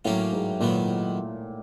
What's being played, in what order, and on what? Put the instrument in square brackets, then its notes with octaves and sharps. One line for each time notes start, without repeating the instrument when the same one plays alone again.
[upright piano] A2 [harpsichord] F#3 A#3 C#4 F4
[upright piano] G#2
[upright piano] A#2 [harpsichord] D#3 F#3 B3